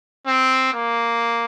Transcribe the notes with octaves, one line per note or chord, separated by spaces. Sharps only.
C4
A#3